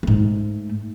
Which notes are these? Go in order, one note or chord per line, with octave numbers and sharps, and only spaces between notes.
G#2 A3